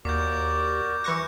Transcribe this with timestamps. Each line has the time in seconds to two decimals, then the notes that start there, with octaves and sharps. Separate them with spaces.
0.05 D#2 F#4 A#4 D5 D6 G6
1.04 E3 C#6 F#6 G6 A#6 C#7